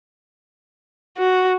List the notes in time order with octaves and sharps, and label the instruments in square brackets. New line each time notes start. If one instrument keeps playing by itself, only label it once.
[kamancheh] F#4